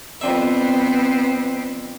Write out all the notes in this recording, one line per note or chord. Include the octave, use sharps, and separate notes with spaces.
F2 D3 B3 C4 E5